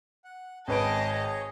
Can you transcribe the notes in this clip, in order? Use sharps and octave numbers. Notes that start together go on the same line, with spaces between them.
F#5
G#1 G#4 B4 C#5 D#5 A5 D7